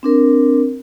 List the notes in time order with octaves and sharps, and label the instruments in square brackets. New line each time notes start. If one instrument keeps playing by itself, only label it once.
[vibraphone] C4 D4 A#4